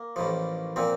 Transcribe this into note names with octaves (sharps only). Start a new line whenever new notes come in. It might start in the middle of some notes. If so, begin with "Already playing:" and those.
Already playing: A#3
A1 A2 F3
A#2 F3 C4